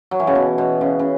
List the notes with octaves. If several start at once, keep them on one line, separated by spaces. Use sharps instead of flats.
F#3
E3
C#3
B2
B2
C#3
C#3